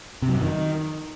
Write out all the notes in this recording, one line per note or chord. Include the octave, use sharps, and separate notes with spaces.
C3
F#3
F#2
D#3